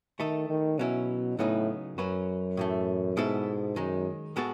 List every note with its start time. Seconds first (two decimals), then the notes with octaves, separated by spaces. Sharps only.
0.19 D#3 A3 D#4 A4
0.49 D#3
0.79 B2 F#3 C#4 E4
1.38 A2 C#3 F#3 B3 D#4
1.98 F#2 F#3 C#4 F#4 B4
2.57 A2 E3 A3
3.17 G#2 B2 G#3 B3 E4 A4
3.76 F#2 D#3 G#3 D#4
4.36 A2 G#3 B3 F#4 A4